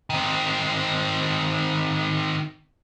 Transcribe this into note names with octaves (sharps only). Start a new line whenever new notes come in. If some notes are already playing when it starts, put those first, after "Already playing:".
D#3 C4